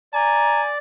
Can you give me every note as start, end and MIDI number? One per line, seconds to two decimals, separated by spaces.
0.14 0.78 74
0.14 0.73 80
0.14 0.60 82